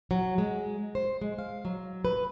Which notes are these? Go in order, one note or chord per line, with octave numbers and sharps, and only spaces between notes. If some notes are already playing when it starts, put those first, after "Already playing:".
F#3
G#3
C5
G#3
F5
F#3
B4